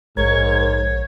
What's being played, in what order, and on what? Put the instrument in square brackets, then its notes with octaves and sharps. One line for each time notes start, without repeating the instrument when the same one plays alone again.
[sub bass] A#1 [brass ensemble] G#2 [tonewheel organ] A#4 G#6 [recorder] C#5